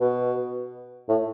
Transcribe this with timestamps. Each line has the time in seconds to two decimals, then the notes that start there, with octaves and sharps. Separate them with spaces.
0.01 B2
1.09 A2